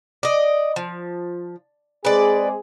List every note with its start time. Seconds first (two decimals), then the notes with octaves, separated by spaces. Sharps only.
0.23 D5 D#5
0.76 F3
2.05 G#3 C4 G#4 B4 D5